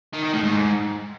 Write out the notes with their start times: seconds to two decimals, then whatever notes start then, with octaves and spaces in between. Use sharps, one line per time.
0.13 D#3
0.23 D#3
0.33 A2
0.43 G#2